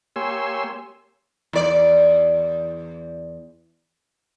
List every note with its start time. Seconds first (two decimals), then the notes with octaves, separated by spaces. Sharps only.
0.16 A#3 G4 C#5 G#5 C6 E6
1.53 E2 D5